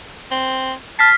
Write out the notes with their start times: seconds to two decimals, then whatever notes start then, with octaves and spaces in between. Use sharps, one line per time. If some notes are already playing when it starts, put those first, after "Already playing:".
0.31 C4
0.99 A5 F6 B6 C7